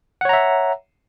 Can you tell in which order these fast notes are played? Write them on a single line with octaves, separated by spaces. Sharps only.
F#5 C#5 A#5 E5